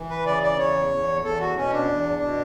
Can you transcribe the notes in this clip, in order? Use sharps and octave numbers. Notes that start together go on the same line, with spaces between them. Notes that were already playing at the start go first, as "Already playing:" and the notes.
Already playing: E3
B4
C#3 D5
D5
E2 C#5
E2
E2 A4
F#4
B2 C#4
D4
E2
B2